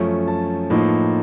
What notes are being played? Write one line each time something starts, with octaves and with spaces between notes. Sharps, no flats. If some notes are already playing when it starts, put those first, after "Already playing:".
Already playing: F#2 F3 A3 C#4
A5
A2 F3 A#3 D#4